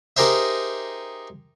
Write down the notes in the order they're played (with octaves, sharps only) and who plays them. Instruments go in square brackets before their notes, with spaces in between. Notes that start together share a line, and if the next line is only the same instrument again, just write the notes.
[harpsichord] D#4 G4 G#4 A#4 C5 E5